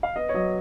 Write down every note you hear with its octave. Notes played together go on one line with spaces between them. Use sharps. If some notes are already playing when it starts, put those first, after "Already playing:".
F5
B3 D#5
C#5
F#3 D#5